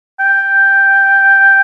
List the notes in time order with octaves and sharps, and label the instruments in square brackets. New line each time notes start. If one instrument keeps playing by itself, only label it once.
[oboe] G5